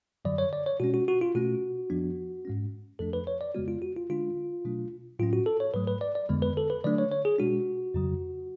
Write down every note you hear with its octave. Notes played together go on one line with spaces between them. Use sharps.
F#2 D3 F#3 D5
C#5
D5
C#5
B2 G#3 C#4 F#4
F#4
F#4
F4
B2 A3 C#4 F#4
F2 F3 B3 D4
G#2 G#3 C#4
F2 F3 A3 D4 A4
B4
C#5
D5
F2 C#3 G#3 B3 F#4
F4
F#4
F4
D3 G#3 D4 F4
B2 F#3 A3 D4
A2 F#3 C#4 F4
F#4
A4
C#5
G#2 F#3 A3 B4
B4
D5
D5
F2 D3 G#3 B3
B4
A4
B4
D3 F#3 A3 D4 D5
C#5
C#5
G#4
B2 G#3 D4 F#4
F2 C#3 F#3